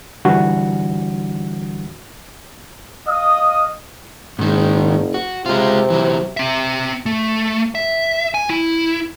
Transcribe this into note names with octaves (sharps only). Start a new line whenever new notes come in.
D3 E3 G3 D4 F#4
D#5 F5 D#6
F#1 G#2 D#3
F#4
C3 G#3 F4
E3 F#3
C4 E5
A3
E5
G#5
E4